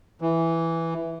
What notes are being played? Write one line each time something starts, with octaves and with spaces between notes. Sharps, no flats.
E3